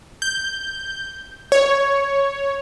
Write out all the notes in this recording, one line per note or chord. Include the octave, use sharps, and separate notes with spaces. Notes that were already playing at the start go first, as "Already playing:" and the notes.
G6
C#5